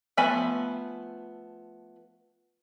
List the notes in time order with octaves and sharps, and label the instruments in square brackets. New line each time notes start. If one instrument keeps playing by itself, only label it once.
[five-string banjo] F3 A3 B3 G#5 B5